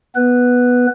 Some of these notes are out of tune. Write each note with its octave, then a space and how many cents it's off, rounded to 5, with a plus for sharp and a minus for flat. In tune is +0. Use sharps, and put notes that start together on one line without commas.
B3 -5 B4 +0